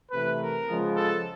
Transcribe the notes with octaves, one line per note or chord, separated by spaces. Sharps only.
C3 E3 A3 B4
A#4
C#3 F3 G#3 B3
A4